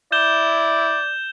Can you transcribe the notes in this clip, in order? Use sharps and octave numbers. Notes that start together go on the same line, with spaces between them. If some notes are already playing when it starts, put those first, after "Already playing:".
E4 D5 G6 E7 G7